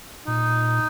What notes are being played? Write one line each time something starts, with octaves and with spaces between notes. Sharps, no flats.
A#2 D#4